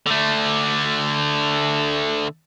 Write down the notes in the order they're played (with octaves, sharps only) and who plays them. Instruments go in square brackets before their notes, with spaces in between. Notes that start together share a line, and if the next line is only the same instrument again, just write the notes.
[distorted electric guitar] D3 A3